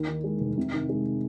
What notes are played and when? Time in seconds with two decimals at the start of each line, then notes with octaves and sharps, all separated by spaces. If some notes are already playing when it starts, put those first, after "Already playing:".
Already playing: D#2
0.08 D#3
0.24 G#3
0.40 F1
0.58 C3
0.73 D#3
0.89 G#3